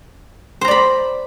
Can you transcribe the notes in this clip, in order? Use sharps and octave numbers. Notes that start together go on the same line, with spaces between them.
C5 D5 A#5 B5